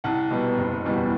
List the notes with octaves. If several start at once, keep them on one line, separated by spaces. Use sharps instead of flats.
C2 F#5 A5
B2 G3 B3
F#1
E2 B2 G3 B3